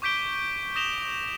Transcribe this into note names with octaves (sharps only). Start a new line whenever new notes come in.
C#6 D6 G6 B6 D7 G7
D#6 A#6 E7 F7 G7